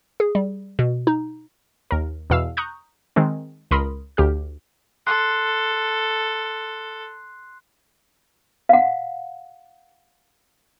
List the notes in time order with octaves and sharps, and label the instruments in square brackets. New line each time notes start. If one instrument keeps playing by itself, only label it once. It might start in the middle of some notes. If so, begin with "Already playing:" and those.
[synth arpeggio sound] G#4
G3
B2
D#4
D#2 A#4
E2 B2 F5 E6
A#5 C#6 D#6 F#6 G6
D#3 G#3 C4
C#2 A#4 B5 C6 D#6
D2 G4 F6
[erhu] A4 [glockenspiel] C6 F#6 C7
[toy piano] F5 F#5